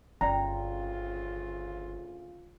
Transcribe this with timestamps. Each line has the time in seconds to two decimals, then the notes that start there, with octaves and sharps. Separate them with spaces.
0.21 G1 D2 C#3 C#4 F4 D5 G5 A#5